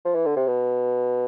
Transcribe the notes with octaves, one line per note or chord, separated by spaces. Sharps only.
F3
E3
D3
C3
B2